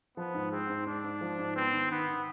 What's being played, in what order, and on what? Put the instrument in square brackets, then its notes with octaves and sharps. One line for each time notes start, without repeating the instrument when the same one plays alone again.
[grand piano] F3 [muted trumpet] B3
[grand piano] G#2
[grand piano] G#3 [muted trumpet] C4
[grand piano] G#2
[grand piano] G#2 [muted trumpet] D4
[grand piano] G#2
F3
G#2
[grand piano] B3 [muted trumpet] C4
[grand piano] D#3
[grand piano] D#3 [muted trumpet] B3
[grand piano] D#3